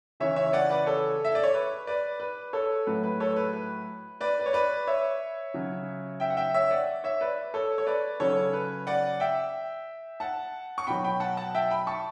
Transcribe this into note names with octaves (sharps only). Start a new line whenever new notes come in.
C#3 E3 C#5 E5
C#5 E5
D5 F#5
B4 D5
A4 C#5
E5
D5
C#5
B4
B4 D5
B4
A4 C#5
A2 F#3 B4
B4
A4 C#5
B4
B4
B4 D5
B4
C#5
B4 D5
C#5 E5
C#3 F#3
E5 G5
F#5
E5 G5
C#5 E5
D5 F#5
C#5 E5
B4 D5
A4 C#5
C#5
B4 D5
C#3 F#3 A4 C#5
B4
D5 F#5
E5 G5
F#5 A5
C#6
B2 F#3 G5 B5
G5 B5
F#5 A5
F#5 A5
E5 G5
G5 B5
A5 C#6